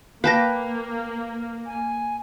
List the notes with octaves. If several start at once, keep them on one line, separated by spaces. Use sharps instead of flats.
A#3 B4 F5 G5 A5 D6 A#6
G#5